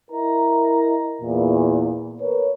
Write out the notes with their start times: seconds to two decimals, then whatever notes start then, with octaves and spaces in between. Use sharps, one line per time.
0.11 E4 A#4 D#5 A#5
1.21 E2 A#2
2.20 A#4 B4 C#5